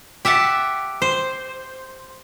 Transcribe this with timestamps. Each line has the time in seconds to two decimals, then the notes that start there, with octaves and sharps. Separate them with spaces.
0.25 G4 E5 F#5 A5
1.02 C5